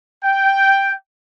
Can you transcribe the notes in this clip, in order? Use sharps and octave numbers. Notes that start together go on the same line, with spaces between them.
G5